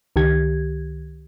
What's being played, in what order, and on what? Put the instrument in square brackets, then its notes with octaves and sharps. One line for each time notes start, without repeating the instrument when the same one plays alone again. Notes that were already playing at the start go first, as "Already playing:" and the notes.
[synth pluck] C#2 D#3 G4 G#6